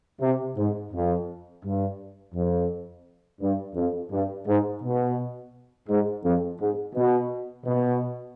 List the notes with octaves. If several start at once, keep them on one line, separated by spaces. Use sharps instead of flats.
C3
G#2
F2
G2
F2
G2
F2
G2
G#2
B2
G#2
F2
G#2
B2
B2